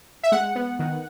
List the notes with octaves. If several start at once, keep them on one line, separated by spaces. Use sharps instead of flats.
E5
G#3 F#5
B3
D#3